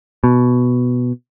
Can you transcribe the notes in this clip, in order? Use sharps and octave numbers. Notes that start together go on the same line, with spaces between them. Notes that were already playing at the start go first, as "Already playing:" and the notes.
B2